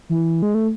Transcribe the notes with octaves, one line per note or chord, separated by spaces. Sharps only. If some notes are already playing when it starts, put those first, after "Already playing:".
E3
G#3
A3